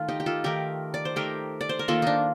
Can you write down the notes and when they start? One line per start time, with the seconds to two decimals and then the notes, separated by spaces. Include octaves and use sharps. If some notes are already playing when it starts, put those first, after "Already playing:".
Already playing: D#3 A3 F4
0.08 D#4 G4
0.20 G4
0.26 F4 A4
0.44 D#3 A3 G4 A#4
0.94 D5
1.05 C5
1.16 D#3 A3 G4 A#4
1.61 D5
1.69 C5
1.79 A#4
1.88 D#3 A#3 F4 A4
2.02 D4 D#4